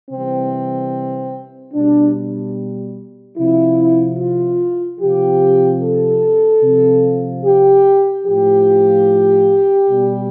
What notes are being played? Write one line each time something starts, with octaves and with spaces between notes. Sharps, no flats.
C3 E3 G3 C4
B2 G3 D4
C3 F3 E4
F4
C3 F3 G4
A4
C3 F3
G4
A2 F3 G4
B2 G3